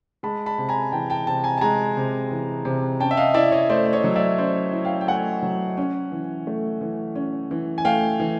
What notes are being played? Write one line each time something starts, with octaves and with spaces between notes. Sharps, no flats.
G#3 A5 B5
A5 B5
C3
G#5 A#5
E3 G5 A5
G5 A5
C3 G5 A5
G#5 A#5
A5
G#3 G#5 A#5
C3
E3
C3
C#4 G5 A5
E5
D#5 F5
E4 D5 E5
C#5 D#5
A3 C5 D5
D5
C#5 D#5
F#3
D5 E5
C#4 C5 D5
E4
F5 G5
G5
A3 F#5 G#5
F#3
C#4
E3
A3
E3
C#4
E3
G#5
A3 F5 G5
E3